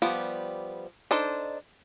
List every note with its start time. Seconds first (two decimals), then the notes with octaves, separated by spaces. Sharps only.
0.02 F3 G3 B3 G4
1.11 D4 D#4 A4 C5